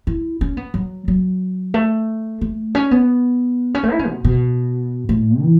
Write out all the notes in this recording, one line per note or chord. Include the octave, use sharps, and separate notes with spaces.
E4
C#4
B3
F#3
F#3
A3
A3
C#4
B3
C#4
A3
E4
C#4
B2
B2
A2
E3